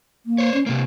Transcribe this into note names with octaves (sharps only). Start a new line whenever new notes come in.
A#3
C5 C#5
C#4
C3 G#3 A#3